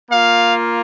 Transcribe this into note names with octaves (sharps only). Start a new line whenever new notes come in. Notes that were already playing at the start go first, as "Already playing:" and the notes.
A#3 F4 F5